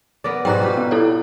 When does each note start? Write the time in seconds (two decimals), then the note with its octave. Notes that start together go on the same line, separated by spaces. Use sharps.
0.24 B3 A#4 D5
0.45 G#2 B2 G3 G5 A#5 F#6
0.61 F4 G4 B4
0.77 B3
0.91 E4 A4 C#5